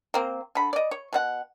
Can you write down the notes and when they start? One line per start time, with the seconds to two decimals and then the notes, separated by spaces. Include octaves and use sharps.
0.14 A#3 C4
0.55 D3 B5
0.73 D5 D#5
0.91 C#5
1.13 B2 C4 F#5